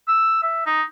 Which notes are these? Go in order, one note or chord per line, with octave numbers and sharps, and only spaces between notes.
E6
E5
D#4